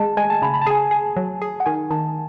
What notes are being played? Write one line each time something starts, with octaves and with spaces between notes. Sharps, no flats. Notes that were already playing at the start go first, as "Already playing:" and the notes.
Already playing: G#3 A5
G#3 G#5
A5
C#3 B5
B5
A5
G#4 G#5
A5
G#4
F#3
G#4
F#5
D#3 G#5
D#3 A5